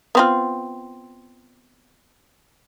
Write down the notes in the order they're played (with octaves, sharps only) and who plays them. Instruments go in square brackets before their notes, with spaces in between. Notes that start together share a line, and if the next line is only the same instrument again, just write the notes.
[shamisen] B3 C4 F4